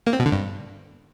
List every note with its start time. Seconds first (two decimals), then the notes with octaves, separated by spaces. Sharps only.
0.07 A#3
0.13 C4
0.19 B2
0.26 D3
0.32 G2